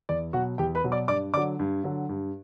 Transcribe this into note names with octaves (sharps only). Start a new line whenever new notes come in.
E2 D5
B2 F#3 F#4 F#5
E2 G4 G5
B4 B5
B2 F#3
D5 D6
G2 D5 D6
D3 F#3 D5 D6
G2
D3 F#3
G2